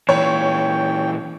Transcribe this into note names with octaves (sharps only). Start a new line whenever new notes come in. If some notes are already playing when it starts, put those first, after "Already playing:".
A#2 E3 C#5 G5